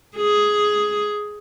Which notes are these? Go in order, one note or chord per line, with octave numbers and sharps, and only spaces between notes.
G#4